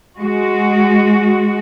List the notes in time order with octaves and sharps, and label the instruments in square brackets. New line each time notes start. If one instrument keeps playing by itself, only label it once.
[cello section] G#3 F#4